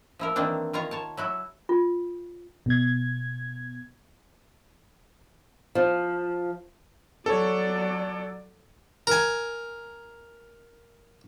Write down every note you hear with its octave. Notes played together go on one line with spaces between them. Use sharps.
F3 E4 A#4
D#3 E3 A#3 C4 D4
D#3 F4 C#5 A#5
C#5 A5
F#3 E4 F#4
F4
B2 G#6
F3
F#3 A4 C#5 D5
A#4 G#5